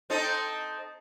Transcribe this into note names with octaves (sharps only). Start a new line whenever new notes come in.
C4 D#4 A4